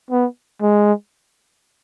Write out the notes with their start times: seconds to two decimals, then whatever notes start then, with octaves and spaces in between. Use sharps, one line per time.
0.11 B3
0.62 G#3